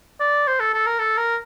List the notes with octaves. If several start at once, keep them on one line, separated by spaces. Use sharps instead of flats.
D5
C5
A4
A4
A#4
A4
A#4